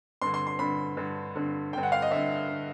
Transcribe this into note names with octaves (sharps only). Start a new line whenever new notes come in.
G2 D3 C6
C6
C6
G2 D3 B5
G2 D3
G2 D3
G2 D3 G5
F#5
F5
D#5
G2 D3 E5
D3